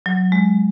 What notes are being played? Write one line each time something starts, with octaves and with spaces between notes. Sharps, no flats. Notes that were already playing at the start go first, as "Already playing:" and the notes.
F#3
G#3